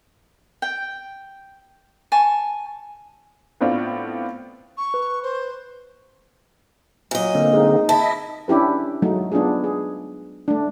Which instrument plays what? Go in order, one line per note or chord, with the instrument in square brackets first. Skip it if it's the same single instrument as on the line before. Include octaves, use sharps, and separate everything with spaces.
[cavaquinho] G5
G#5 A5 C#6
[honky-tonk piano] A2 B3 C4 D4 F4
[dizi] C#6
[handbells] B4
[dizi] C5
[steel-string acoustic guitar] A#2 D#5 [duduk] F#3
[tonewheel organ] D3 A#3 C4
[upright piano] G#3 [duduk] D#4
[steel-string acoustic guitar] E4 [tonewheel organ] D#5 E5 [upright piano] A5
[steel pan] C#4 D4 E4 G4 B4
F#3 G#3 A3 D#4
B3 D4 D#4 F4 G#4
G#4
A3 D4